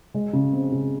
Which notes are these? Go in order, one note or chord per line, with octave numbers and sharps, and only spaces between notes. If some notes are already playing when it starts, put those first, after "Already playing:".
G#3
C#3
C4
C#3